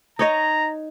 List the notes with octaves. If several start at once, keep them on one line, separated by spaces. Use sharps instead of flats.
D#4 C#5 D#5 A#5